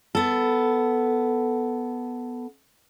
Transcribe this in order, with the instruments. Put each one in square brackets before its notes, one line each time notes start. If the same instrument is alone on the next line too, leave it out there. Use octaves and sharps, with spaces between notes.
[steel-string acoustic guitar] B3 A4